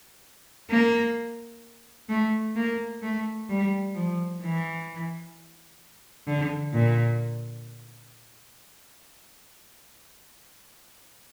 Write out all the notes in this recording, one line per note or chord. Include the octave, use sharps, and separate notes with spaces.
A#3
A3
A#3
A3
G3
F3
E3
D3
A#2